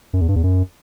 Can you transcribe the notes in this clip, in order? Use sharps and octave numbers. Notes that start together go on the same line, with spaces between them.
F#2
E2
G2
E2
F#2